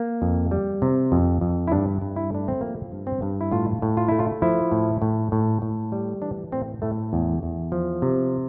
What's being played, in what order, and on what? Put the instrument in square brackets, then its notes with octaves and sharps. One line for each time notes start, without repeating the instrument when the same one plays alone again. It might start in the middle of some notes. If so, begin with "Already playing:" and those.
Already playing: [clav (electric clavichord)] A#3
F2
G3
C3
F2
F2
E4
G2 D4
G2
E4
A3 D4
C4
F3 A#3
G2
C4
G2
E4
A2 F4
A2
F4
A3 E4
F4
F3 E4
A2
A2
A2
A2
G3
E3 D4
A2 C4
A2 A3
E2
E2
F3
C3